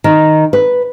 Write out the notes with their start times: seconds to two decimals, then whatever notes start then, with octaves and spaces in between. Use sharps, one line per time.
0.04 D#3
0.53 B4